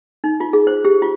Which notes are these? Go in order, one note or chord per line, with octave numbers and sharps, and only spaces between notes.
D#4
F4
G#4
C5
G4
F4